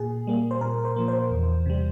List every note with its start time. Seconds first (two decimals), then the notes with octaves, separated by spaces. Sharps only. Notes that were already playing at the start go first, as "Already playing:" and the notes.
Already playing: A#2 G#4
0.27 G3 A#3
0.51 C5
0.61 A#2 A#4
0.85 C5
0.96 F3 A#3
1.08 C5
1.31 E2
1.66 C3 G3